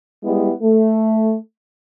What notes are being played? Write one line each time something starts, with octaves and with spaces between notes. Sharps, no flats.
G3 G#3 B3 E4
A3